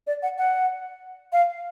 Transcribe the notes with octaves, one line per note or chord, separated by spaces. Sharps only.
D5
F#5
F#5
F5